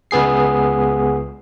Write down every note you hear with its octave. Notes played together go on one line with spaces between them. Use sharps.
C#2 B3 G#4 C7